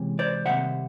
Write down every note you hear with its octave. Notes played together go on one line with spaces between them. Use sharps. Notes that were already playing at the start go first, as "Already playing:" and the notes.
Already playing: C3 E3 G#3 C#4
C5 D5
C3 D#3 G3 E5 F#5